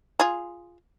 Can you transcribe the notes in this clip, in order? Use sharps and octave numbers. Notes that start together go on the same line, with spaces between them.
F4 G#4